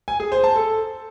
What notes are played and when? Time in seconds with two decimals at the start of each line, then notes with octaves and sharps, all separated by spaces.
0.08 G#5
0.20 G#4
0.32 C5
0.44 A5
0.56 A4